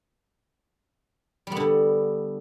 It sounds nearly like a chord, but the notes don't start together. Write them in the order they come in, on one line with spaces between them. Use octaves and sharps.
G3 B3 D3